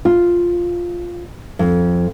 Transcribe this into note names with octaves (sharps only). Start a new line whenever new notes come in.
F4
F2